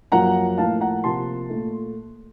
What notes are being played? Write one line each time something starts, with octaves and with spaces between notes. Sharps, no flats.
F#2 F3 A#3 F#5 A#5
A2 F3 A#3 F5 A5
F#5 A#5
C3 F3 A#3 A5 C6
A#2 A3